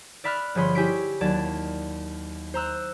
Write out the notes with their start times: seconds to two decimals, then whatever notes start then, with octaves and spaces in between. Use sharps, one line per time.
0.24 D5 E5 B5 F6 F#6
0.55 G1 F3 G#4 C#5 B5 C6
0.75 E4 G4 G#5 C#6 B6 D7
1.21 D#2 F#3 D5 A5 G#6
2.54 C5 A#5 E6 F#6